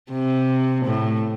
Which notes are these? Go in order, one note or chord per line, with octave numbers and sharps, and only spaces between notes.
C3
A2